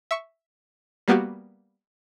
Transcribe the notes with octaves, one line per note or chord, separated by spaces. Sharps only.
E5 C#6
G3 A#3 B3 F#4 G4